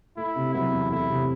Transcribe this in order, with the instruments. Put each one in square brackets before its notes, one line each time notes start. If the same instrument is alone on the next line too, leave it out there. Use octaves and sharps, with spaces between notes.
[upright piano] A3 [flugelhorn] E4
[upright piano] C3
[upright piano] F#3 [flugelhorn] E4
[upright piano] E2
[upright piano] A3 [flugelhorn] E4
[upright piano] C3